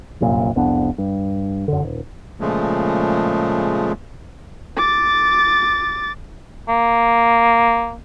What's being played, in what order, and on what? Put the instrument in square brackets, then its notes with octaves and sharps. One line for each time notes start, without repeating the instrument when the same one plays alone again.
[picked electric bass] G1 C2 F#2 A#2
C2 F2 B3 D4
G2
F#2 D3
D#1
[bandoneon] A#2 C#3 F3 G#3 A3
[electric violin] D6 A6
[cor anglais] A#3